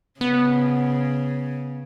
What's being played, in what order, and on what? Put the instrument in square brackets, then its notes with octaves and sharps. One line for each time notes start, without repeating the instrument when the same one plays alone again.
[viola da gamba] C#3 [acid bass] B3